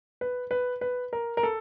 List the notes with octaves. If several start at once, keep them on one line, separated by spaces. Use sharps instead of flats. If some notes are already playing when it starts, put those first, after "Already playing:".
B4
B4
B4
A#4
A#4
A4